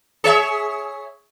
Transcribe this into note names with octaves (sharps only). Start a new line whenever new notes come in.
G#4 C#5 E5